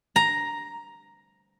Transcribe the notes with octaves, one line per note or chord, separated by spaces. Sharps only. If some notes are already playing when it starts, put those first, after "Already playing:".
A#5